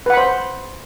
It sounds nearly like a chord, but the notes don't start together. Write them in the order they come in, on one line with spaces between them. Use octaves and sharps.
B4 F#5 B5 C5